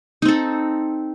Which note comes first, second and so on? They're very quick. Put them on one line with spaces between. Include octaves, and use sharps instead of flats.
D#4 C4 A4